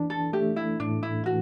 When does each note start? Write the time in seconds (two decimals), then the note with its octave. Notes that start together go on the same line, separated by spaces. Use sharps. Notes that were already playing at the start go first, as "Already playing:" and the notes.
Already playing: E3 D4
0.10 A4
0.33 A3 G4
0.56 E4
0.80 A2 D4
1.03 E4
1.26 E3 F#4